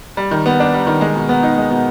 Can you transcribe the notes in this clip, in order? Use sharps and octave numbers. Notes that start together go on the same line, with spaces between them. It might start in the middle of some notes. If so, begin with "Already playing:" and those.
G3
D#3
B3
D4
G3
D#3
G#3
B2
B3
D#4
G#3
B2